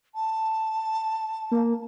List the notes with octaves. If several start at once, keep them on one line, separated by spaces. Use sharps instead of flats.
A5
A#3